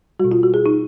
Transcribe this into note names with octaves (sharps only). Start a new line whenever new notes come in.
B2 G3 F#4
F4
F#4
G#4
D#4